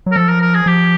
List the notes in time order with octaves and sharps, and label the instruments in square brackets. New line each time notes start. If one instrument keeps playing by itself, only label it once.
[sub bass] F#3
[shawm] A#4
[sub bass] F3 [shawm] A4
[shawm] A#4
A#4
G#4
[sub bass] F3 [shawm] G4